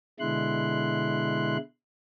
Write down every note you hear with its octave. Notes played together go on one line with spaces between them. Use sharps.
B2 D3 G#3 E4 C6 F#6